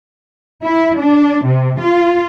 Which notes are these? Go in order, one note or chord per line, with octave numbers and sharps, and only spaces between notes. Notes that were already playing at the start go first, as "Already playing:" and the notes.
E4
D4
C3
F4